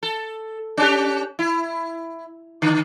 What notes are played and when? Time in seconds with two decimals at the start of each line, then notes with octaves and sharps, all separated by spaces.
0.03 A4
0.77 C#4 D4 G4
1.39 E4
2.62 D3